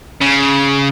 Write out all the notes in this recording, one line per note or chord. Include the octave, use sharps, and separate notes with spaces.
C#3